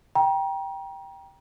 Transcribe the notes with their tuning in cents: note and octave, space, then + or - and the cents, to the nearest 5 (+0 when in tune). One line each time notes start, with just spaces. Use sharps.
G5 +0 A#5 +30